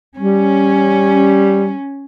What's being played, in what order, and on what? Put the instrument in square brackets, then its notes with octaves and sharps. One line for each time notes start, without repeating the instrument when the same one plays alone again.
[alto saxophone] G3 [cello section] C#4